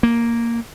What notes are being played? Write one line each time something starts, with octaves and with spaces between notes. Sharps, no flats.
A#3